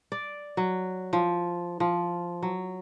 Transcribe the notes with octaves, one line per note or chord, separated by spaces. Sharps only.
D5
F#3
F3
F3
F#3